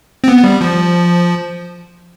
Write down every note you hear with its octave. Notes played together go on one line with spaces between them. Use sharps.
C4
B3
G3
F3